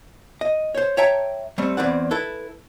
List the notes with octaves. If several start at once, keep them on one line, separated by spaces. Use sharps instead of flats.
D#5
C5 C#5
C#5 E5 G5 A5 A#5
G3 A3 C4
E2 C4 E4 D5 F#5
E4 A4 B4